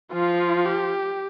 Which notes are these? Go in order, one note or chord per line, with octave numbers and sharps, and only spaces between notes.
F3 F4
G4